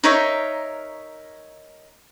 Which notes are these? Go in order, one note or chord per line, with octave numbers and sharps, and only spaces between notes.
D#4 A#4 C#5 E5